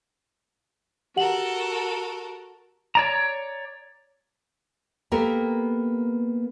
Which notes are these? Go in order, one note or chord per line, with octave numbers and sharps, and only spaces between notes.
F#4 G4 A4 A#4 F#5 F#7
C#5 D5 A#5
A#3 B3 G4 A4 A#4